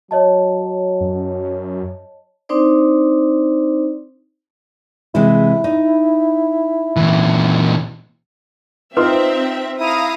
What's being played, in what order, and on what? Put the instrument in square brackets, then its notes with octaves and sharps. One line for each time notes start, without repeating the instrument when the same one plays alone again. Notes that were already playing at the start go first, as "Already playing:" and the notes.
[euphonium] F#3 [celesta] C#5 D#5 A5
[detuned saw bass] F#2
[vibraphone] C4 D4 D#4 C5 D5
[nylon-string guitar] C3 E3 G#3 [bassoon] E4
[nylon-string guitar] D#4
[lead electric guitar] A#2 E3
[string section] C4 E5 [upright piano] D#4 F4 C6 [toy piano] B4
[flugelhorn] E4 [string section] F5 A#5 D#6